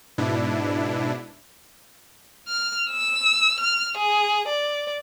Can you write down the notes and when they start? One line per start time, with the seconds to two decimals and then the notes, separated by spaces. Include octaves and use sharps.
0.18 G#2 B2 D4 E4
2.48 F6
2.91 E6
3.60 F6
3.98 G#4
4.48 D5